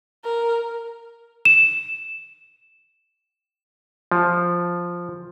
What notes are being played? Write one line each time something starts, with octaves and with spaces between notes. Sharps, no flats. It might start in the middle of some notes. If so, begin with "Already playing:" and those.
A#4
E7
F3